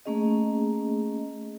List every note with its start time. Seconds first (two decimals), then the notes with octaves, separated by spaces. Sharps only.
0.06 A3 A#3 C#4 G#4 D#5